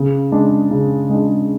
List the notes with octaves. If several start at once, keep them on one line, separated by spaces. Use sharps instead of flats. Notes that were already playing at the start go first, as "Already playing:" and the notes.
Already playing: C#3
G#3 D4
C#3
G#3 D4